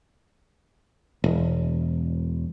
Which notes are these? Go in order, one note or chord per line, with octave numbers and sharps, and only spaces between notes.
E1